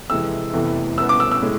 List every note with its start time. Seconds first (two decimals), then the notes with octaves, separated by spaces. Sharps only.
0.10 F2 C3 E3 G#3 E6
0.53 F1 E2 C3 E3 A3
0.98 C2 B2 B3 E6
1.09 D6
1.20 E6
1.31 E6
1.42 A2 G#3